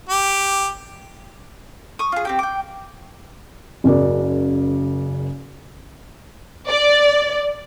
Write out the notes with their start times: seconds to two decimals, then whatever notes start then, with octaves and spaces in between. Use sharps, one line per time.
0.09 G4
1.99 C#6 D#6
2.12 F4 G#4
2.25 C4 G4 G5
2.39 G5 D6
3.84 F#1 C#3 F#4 A#4 D5
6.68 D5